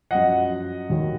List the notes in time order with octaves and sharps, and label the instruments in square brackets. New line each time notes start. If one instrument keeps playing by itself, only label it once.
[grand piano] F#2 F3 D#5 F#5
D#2 D#3 F#3